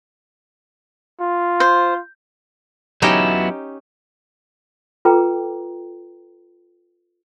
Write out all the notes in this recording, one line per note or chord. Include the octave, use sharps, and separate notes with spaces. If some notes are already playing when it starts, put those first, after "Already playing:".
F4
C5
F#3 B3 C#4 D#4 E4 G4
F4 A4 B4 G5 A#5 D6